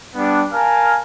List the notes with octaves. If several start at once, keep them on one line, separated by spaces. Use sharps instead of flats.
G3 B3 D4
A#4 F5 G#5 A5